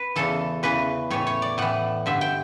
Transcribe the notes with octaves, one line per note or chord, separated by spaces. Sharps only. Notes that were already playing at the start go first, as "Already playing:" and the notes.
Already playing: B4
E2 C#3 E3 A4
E2 C#3 E3 B4
A2 E3 C#5
C#5
D5
A2 E3 F#5
G2 D3 E5
G5